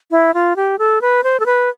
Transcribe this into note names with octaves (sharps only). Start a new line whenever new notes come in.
E4
F4
G4
A4
B4
C5
A4
B4